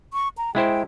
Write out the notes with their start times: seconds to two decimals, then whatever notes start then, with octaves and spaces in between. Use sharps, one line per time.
0.13 C#6
0.38 A#5
0.55 G#3 E4 C5 G5